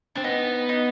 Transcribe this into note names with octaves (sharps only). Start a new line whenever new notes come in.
C4 D4
B3 D#4
D#4